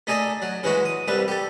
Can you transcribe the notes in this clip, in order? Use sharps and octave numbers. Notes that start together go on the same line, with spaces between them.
A3 D#4 G#4 A4 D5 D#5
F#3
C#3 E3 G#3 F#4
D#6
C2 G3 B4 E5
G4 A4